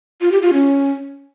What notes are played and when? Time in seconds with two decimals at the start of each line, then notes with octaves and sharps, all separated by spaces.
0.21 F4
0.32 G4
0.42 F4
0.53 C#4